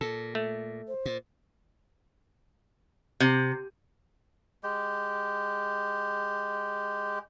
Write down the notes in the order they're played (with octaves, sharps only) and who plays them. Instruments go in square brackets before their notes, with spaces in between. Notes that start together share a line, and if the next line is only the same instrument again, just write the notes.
[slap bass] A#2 [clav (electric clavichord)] A4
[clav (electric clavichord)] A3
[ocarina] C5
[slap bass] A#2
[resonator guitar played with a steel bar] C3
[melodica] G#3 G4